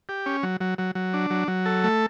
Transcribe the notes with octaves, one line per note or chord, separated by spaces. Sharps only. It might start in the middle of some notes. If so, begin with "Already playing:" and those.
G4
C#4
F#3
F#3
F#3
F#3
D4
F#3
F#3
A4
A3